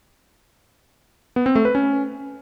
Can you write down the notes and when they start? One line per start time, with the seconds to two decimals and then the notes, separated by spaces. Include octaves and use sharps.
1.36 B3
1.46 C4
1.55 A3
1.65 B4
1.75 C#4